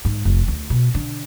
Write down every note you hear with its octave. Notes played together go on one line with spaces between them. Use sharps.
G#2
F1
D2
B2
D3